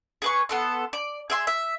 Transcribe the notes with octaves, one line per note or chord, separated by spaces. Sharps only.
G#4 B4 C#6
B3 A4 C6
D5
G#4 E5 C6
E5